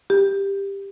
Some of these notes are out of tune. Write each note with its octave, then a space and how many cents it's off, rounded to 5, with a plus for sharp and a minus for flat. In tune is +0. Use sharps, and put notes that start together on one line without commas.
G4 +10